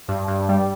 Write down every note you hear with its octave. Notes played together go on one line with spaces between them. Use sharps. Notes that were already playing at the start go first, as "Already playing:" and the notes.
G2
G2
G3